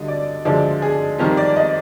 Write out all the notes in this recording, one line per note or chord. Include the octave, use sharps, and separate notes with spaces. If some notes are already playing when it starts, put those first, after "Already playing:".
Already playing: D2 D3 G3 D#5
D5
D2 D3 F3 G#3 D5
G#4
F2 D#3 G3 F4
D5
D#5